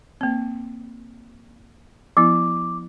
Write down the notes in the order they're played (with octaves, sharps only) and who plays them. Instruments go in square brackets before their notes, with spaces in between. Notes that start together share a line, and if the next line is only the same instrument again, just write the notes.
[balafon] A#3 C4
[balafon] F3 B3 E4 [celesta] D6